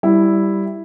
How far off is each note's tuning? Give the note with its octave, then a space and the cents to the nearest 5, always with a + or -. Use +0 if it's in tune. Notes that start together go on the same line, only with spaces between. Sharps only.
G3 +0 E4 +0